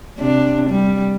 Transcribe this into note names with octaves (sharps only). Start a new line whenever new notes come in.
C3 D4
G3